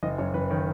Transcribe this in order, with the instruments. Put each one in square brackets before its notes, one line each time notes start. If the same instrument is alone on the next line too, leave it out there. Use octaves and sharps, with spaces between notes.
[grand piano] F#1 D#5
F#2 C#5
F#1 B4
D#3 C#5